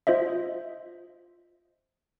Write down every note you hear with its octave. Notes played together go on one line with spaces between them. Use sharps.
F4 C5 D#5 E5